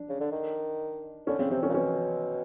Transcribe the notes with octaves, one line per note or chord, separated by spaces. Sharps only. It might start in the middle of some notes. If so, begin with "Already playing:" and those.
Already playing: D4
C#3
D3
D#3
D3 C#4
C#3 C4
C3 C4
D3 C#4
A#2
B2 C#4